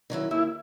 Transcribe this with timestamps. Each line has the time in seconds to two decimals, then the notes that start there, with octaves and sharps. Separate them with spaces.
0.10 D#3 F#3 C#4 E4
0.31 D#2 E4